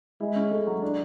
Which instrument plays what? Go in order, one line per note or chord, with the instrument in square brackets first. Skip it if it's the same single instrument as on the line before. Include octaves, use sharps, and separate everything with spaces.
[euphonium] G#3 [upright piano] E4
[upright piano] C#4
A3
F#3
D4